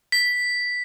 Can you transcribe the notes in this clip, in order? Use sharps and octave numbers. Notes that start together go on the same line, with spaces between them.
B6